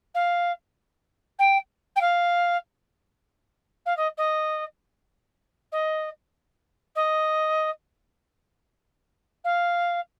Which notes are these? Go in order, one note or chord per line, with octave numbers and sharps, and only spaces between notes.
F5
G5
G5
F5
F5
D#5
D#5
D#5
D#5
F5